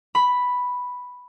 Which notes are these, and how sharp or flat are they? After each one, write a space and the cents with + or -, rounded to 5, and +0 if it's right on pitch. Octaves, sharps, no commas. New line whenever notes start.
B5 +0